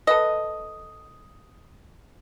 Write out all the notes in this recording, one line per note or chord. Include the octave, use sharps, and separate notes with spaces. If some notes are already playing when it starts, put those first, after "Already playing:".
A4 B4 D#5